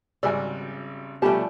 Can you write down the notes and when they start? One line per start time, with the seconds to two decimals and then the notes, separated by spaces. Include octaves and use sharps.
0.23 G#1 C#3 G3 F#4 D5 G#5 E6
1.22 B2 F3 G3 A3 C#4 D4 G4 A5